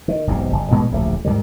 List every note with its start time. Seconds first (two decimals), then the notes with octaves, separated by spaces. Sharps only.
0.08 D#3
0.27 E1 B1 G#2 C3
0.52 F#1
0.71 A1 A#2 G#3 B3
0.91 D1 A#1 G#2 A3
1.25 G#2 B2 D#3 G3